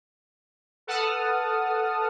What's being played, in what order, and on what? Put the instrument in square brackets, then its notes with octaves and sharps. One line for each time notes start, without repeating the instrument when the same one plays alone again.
[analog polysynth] A4 B4 F#5 A5 D#6 F6